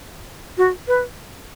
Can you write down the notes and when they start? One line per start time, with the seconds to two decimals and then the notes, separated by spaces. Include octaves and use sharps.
0.58 F#4
0.88 B4